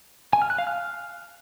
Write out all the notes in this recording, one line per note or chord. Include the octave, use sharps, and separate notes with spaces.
G#5
F6
F#6
F5
F6